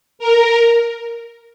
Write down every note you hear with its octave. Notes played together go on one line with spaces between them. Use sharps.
A#4